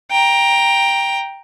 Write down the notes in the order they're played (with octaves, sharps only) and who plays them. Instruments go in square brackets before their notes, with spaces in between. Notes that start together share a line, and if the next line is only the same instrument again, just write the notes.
[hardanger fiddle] G5 A#5